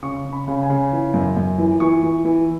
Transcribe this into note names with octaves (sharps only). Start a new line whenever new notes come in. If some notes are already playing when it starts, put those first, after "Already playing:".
C#3 C#6
C#3
B5
C#3
G#5
C#3
E3
F#2
F#2
E3
E3 C#6
E3
E3